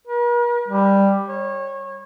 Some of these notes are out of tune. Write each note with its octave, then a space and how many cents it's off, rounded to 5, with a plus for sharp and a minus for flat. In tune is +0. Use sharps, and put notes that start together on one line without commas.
A#4 +45
G3 +10
C#5 -25